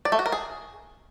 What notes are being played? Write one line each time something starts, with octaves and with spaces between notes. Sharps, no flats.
D5
A3
F#4
A#4
G#4